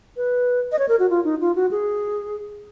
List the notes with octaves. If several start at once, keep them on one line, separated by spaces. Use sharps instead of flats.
B4
D#5
C#5
A#4
F#4
F4
D#4
F4
F#4
G#4